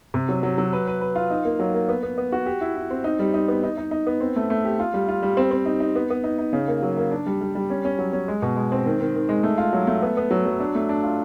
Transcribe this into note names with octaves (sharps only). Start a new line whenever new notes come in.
C3
F#3
F#3
F#3
B4
B4
B4
F4
D#4
A#3
F#3
A#3
B3
B3
B3
F#4
G4
E4
E4
C4
D#4
G3
D#4
B3
D#4
D#4
D#4
B3
C4
A3
A3
G4
F4
G3
F4
G3
C4
C4
D#4
D#4
B3
B3
D#4
D#4
C#3
A#3
F#3
A#3
D4
G3
G3
G3
C#4
C#4
F#3
C#4
G#3
B2
G#3
C4
D#3
D#3
D#3
G#3
A3
F4
F#3
A3
B3
B3
F#3
F#3
D4
A3
D4
F4